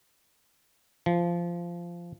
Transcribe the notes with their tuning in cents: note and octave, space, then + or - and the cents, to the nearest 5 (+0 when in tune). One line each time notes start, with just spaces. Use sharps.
F3 -15